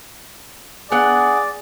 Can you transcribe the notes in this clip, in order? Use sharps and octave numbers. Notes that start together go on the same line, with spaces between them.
B3 D4 G#4 D5 F#5